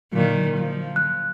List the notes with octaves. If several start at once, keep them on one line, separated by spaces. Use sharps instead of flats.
A#2 D3 D#3 F#3
F3
F#6